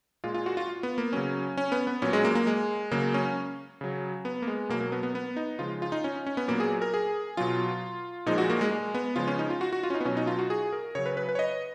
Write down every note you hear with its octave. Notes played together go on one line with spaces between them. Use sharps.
A#2 G#3 F4
F4
F#4
F4
B3
A#3
C#3 F#3 C#4
C#4
B3
B3
A#2 F#3 C#4
G#3
A#3
A#3
G#3
C#3 F#3 A#3
C#4
C#3 F#3
B3
A#3
G#3
B2 F#3 A#3
A#3
B3
B3
B3
D#4
C#3 F3 G#3 F4
F4
D#4
C#4
C#4
B3
A#2 F#3 A#3
G#4
A#4
G#4
B2 F#3 F4
A#2 F3 G#3 D#4
F#4
A#3
G#3
G#3
B3
C#3 F3 G#3 F4
C#4
D#4
F4
F#4
F#4
F4
C#4
D#4
B3
B2 F#3 C#4
D#4
F4
F#4
G#4
A#4
C#3 F#3 C#5
B4
B4
B4
C#5
D#5